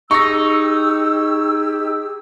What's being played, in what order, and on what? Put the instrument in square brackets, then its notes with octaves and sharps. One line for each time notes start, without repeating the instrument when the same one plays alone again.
[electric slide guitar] D#4 [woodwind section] G4 G#4 E6 [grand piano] C#6 A#6